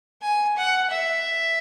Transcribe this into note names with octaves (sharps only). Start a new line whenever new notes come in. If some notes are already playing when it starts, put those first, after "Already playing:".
G#5
F#5
E5